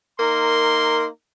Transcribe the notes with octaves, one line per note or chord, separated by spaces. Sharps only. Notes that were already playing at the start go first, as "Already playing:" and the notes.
A#3 D#4 A#4 C6